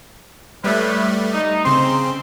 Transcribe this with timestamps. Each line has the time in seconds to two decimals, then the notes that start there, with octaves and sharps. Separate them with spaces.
0.64 A2 G3 A3 B4
1.33 D#4
1.65 C#3 C4 C6